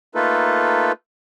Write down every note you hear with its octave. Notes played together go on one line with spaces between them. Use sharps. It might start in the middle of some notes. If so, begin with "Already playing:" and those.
A3 A#3 D#4 F4 A4 B4